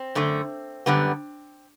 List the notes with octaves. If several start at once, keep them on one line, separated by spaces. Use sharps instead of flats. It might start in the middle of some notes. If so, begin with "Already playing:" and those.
Already playing: C4
F#2 D3 A3
F#2 D3 G3 B3